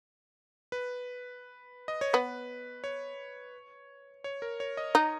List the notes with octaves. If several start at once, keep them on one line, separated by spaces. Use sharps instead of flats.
B4
D#5
C#5
B3 B4
C#5
C#5
A#4
C#5
D#5
D#4